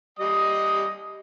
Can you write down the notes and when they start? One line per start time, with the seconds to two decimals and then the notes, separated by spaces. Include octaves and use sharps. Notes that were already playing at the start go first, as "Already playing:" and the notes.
0.19 G3 D#5 D#6